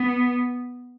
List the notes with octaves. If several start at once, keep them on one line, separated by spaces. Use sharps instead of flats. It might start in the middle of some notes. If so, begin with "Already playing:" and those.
Already playing: B3